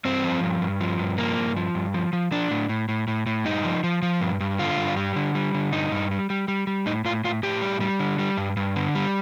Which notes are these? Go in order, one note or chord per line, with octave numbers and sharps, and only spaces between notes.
G2 C4
F3
G2
G2
F3
G2
F3 A#3
G2
F3
G2
F3
F3
F3 D4
A2
A2
A2
A2
A2
G2 D#4
F3
F3
F3
G2
G2
D3 F4
G2
G3
D3
G3
D3
G2 D#4
G2
G3
G3
G3
G3
A2 D#4
A2 F4
A2 F4
A2 G4
G3
G3
D3
G3
G2
G2
D3
G3